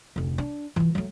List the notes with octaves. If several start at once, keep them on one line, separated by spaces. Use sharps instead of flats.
F1 D2
D4
E3 F4
F#3 A3